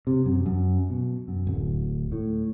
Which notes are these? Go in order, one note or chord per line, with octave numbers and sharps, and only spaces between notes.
C3
F#2
F#2
B2
F#2
D1
A2